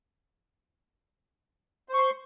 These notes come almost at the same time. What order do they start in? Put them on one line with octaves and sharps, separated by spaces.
C5 C#6 C6